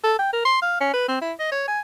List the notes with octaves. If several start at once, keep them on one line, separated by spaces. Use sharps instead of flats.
A4
G5
A#4
C6
F5
C#4
B4
C4
E4
D#5
C#5
G#5